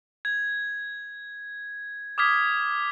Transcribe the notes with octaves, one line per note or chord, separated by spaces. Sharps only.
G#6
D6 D#6 F6 G#6 B6